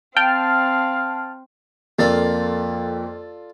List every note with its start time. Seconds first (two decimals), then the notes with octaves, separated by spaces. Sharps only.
0.17 C4 F5 G5 A5 F6
1.99 F2 A#3 F4 A4 D5 A6